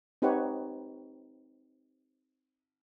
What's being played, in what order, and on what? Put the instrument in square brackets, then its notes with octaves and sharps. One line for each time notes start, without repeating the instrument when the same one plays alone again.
[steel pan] C4 D#4 G4 B4 C#5 F#5